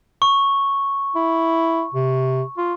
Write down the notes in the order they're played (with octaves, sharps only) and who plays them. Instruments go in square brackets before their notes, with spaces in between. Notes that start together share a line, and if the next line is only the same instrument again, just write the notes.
[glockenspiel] C#6
[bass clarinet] E4
C3
F4